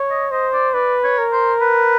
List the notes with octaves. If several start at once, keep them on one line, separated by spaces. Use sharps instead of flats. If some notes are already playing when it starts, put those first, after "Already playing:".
Already playing: C#5
D#5
C5 D#5
D5
B4 D5
C#5
A#4
C5
B4